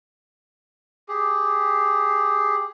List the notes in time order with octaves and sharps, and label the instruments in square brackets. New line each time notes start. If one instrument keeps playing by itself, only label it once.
[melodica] G4 G#4